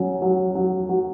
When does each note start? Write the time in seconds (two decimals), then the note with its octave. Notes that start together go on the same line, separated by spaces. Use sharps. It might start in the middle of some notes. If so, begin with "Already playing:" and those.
Already playing: F#3 C#4
0.22 F#3
0.55 F#3
0.89 F#3